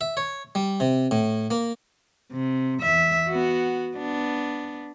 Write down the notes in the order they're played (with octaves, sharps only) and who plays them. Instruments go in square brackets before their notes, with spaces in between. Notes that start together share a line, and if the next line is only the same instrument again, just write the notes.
[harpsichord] E5
C#5
G3
C3
A2
A#3
[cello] C3
E2 E5
B3 F#4
B3 D4